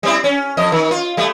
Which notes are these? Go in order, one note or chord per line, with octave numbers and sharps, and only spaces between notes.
G3 C4 E4
C#4
F2 D#5
D#3
F4
G3 A3